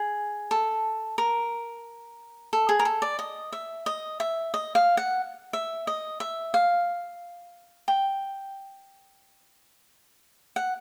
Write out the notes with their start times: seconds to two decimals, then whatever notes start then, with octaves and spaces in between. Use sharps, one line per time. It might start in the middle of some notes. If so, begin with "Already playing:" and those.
Already playing: G#4
0.51 A4
1.18 A#4
2.53 A4
2.69 G#4
2.79 A#4
2.85 A4
3.02 D5
3.19 D#5
3.52 E5
3.86 D#5
4.20 E5
4.54 D#5
4.75 F5
4.97 F#5
5.53 E5
5.87 D#5
6.20 E5
6.54 F5
7.88 G5
10.56 F#5